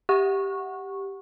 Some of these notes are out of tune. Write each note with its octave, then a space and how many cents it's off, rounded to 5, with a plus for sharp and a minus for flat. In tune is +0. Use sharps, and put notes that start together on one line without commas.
G4 +0 F#5 +0 C#6 -10